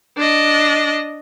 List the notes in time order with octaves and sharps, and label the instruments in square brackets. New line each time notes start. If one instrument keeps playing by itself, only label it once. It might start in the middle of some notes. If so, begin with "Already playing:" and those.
[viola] D4 D#5